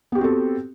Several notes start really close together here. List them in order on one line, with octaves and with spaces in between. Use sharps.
B3 G4 F#4 C4 A4